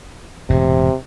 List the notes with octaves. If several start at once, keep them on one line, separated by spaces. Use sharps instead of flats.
E1 A2 C3